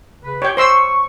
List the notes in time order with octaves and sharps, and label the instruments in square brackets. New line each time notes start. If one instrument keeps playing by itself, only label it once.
[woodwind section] C#3 B4
[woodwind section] F4 G4 [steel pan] C#5 G5
[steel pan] C5 C6 E6 [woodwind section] C#6